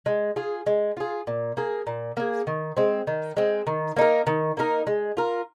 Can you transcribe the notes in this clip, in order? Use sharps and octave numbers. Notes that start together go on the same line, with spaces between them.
G#3
F4 G#4
G#3
F4 G#4
A#2
A#3 G#4
A#2
A#3 G#4
D#3
G#3 C4
D#3
G#3 C4
D#3
A#3 D#4 A#4
D#3
A#3 D#4 A#4
G#3
F4 A#4